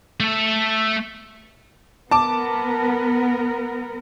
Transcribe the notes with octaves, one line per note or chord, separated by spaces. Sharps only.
A3 A4
B3 A#4 A5 D6